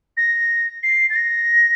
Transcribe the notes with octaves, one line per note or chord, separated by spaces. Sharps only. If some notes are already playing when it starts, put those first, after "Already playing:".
A#6
C7
A6
A#6